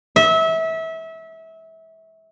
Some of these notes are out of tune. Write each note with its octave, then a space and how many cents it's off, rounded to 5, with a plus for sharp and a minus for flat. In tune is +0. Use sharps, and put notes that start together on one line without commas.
E5 -25